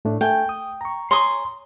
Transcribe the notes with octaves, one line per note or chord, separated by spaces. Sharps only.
A2 A3 D4
A3 G5 G#5
D#6
A#5 C#6
C#5 G#5 A#5 C6 C#6 D#6